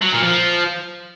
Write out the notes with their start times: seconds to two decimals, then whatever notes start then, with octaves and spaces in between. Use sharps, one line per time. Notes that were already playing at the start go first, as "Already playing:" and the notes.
0.02 F#3
0.12 A#2
0.23 F3